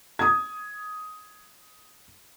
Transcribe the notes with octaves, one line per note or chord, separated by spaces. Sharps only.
D#6 G#6